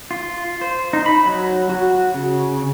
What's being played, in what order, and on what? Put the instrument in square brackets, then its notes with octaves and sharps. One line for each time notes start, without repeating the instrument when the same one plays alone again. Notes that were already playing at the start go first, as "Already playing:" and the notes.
[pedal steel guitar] F4
C5
D#4
B5
F#3
F#4
C#3